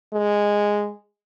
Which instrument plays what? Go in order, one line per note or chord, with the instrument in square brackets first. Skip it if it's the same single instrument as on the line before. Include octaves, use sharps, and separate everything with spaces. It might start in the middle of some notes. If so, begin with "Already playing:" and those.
[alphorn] G#3